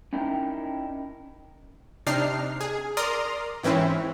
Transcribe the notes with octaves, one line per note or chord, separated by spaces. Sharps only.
C#4 D#4 E4 A#4 G5
C3 D4 D#4 F6 C7
G#4
A#4 D5 A#5 C6 D#6 F6
G#2 E3 C4 C#4 E4